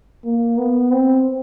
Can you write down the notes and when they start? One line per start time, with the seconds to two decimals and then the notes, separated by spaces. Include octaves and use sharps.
0.25 A#3
0.57 B3
0.91 C4